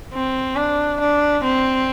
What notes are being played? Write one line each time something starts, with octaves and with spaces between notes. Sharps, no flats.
C4
D4
D4
C4